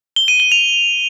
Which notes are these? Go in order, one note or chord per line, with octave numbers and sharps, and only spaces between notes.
G7
D#7
G7
F7